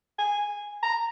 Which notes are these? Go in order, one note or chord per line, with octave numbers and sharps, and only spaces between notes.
G#5
A#5